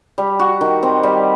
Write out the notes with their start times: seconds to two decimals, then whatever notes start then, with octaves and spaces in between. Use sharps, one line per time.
0.18 G3
0.39 F#4
0.61 D#3
0.83 C4
1.03 G3